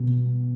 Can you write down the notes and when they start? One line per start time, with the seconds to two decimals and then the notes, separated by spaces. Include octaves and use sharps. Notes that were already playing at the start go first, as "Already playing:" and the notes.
Already playing: B2